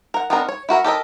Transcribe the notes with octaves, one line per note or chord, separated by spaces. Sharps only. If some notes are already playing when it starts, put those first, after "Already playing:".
A#4 F#5
B3 C4 D4 D#4 A#4
C#5
E4 F#4 A#4 E5
G4 A4 A#4 D#5